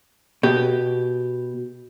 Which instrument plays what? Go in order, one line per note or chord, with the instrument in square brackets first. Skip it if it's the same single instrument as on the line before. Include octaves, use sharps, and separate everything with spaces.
[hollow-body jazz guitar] B2 [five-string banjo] G4